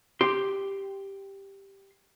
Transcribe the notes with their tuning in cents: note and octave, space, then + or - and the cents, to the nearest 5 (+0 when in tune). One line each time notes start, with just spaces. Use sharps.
G4 +0 C6 +0